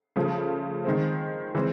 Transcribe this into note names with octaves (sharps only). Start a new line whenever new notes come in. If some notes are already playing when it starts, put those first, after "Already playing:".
C#3 F3 A3
D#3 G#3 C4
E3 G#3 C4